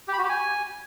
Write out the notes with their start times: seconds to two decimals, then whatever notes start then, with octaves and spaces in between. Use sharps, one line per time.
0.08 G4
0.13 B5
0.18 F#4
0.24 G4
0.29 G#5